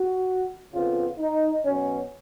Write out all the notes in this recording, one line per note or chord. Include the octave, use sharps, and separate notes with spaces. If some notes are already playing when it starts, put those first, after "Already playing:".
Already playing: F#4
F2 C#3 F3 B3 F4
D#4
B2 F#3 B3 C#4